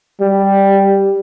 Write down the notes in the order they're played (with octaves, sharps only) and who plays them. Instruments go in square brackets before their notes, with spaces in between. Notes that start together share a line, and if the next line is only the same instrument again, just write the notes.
[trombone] G3